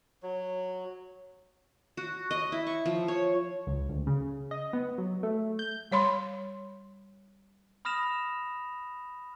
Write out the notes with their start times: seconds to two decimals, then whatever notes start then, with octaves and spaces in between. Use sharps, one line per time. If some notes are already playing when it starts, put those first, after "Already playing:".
0.23 F#3
1.97 F#4
2.31 D#5
2.52 E4
2.67 C#6
2.86 F3
3.08 C#5
3.67 C#2
3.89 D2
4.07 C#3
4.51 D#5
4.73 B3
4.98 F#3
5.23 A3
5.59 G6
5.91 G3 C#5 B5 C6
7.85 B5 D#6 F6 A#6 E7 F7